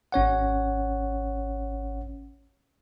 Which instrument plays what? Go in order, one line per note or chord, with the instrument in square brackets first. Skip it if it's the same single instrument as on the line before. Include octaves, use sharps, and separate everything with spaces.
[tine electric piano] G#1 C#4 C#5 F#5